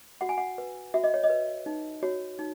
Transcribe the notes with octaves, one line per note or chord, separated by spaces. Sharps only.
F#4 F#5
G#5
F#5
B4
F#4 E5
D#5
C#5
D#5
B4
D#4
F#4 C#5
D#4